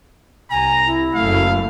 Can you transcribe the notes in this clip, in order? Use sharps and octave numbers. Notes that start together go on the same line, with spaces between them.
C2 G#5 A#5
E4
F#1 F#2 A3 F5